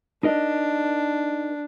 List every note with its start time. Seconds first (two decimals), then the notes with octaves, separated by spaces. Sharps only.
0.23 D4 D#4 A#4 D#5